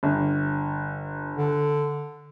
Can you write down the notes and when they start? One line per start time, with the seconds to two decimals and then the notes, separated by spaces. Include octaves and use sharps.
0.03 G1
1.37 D3